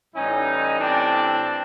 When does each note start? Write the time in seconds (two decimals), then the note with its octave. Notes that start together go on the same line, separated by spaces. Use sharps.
0.14 A2 E3 G3 C#4 D#4
0.80 C4 D4